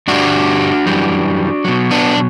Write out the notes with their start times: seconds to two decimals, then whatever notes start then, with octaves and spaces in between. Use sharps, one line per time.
0.08 G2 D3 G3 D4 F#4
0.86 F#2 E3 G3
1.65 B2 F#3
1.91 B3 D4